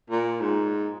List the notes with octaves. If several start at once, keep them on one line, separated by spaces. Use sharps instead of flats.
A#2
G#2